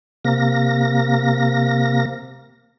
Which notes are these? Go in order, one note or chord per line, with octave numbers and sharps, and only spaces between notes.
C3 A#3 A#6